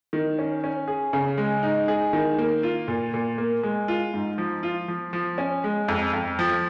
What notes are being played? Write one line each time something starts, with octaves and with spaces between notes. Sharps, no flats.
D#3
C#4
C#4
G#4
C#3
G#3
D#4
G#4
D#3
A#3
F4
A#2
A#2
A#3
G#3
F4
G#2
F3
F4
F3
F3
C#4
G#3
F2
F2
F3